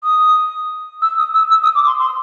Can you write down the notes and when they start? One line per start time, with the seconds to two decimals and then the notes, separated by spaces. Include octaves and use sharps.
0.03 D#6
1.01 E6
1.18 D#6
1.34 E6
1.50 E6
1.62 D#6
1.75 D6
1.86 C6
1.99 C6